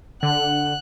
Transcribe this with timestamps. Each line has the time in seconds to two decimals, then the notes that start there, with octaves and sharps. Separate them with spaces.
0.23 D3 F#5 F#6